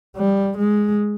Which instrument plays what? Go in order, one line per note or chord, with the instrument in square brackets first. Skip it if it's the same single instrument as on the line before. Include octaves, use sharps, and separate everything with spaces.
[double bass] G3
G#3